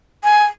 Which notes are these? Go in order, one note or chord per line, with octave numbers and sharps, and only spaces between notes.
G#5